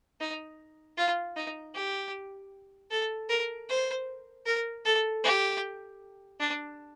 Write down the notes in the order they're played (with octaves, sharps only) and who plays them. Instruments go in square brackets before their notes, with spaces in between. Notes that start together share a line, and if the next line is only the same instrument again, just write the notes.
[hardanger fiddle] D#4
F4
D#4
G4
A4
A#4
C5
A#4
A4
G4
D4